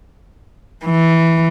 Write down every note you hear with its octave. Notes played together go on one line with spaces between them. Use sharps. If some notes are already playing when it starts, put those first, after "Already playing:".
E3